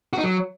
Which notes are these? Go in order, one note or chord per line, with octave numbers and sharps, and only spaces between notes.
F#4
D#4
F#3